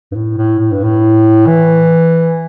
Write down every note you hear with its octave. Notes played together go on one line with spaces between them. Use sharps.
G2
A2
A2
A2
G2
A2
E3